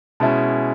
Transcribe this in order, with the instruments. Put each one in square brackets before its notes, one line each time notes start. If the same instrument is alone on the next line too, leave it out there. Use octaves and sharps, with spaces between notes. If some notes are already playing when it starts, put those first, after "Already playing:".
[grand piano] B2 G#3 C#4 E4 A5